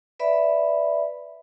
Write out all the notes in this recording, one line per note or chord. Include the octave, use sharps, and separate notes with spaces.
B4 D5 E5 B5